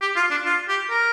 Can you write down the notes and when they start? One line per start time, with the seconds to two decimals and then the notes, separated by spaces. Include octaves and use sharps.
0.01 G4
0.16 F4
0.31 D4
0.45 F4
0.68 G4
0.90 A#4